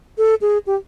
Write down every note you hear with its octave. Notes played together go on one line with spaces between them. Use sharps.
A4
G#4
G4